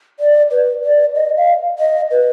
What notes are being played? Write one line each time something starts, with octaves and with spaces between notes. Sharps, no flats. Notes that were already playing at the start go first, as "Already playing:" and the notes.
D5
B4
D5
D#5
F5
D#5
B4